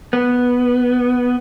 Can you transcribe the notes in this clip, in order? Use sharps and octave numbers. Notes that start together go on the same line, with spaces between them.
B3